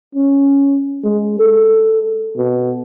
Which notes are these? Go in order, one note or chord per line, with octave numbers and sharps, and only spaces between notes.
C#4
G#3
A4
B2